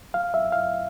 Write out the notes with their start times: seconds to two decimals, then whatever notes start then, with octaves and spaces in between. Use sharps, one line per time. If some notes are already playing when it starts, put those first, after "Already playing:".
0.14 F5
0.34 E5
0.52 F5